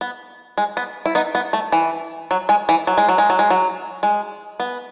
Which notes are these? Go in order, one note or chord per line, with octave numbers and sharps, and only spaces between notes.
B3
G#3
B3
E4
B3 D#4
B3
A3
E3
F#3
G#3
E3
F#3
G#3
F#3
G#3
F#3
G#3
F#3
G#3
B3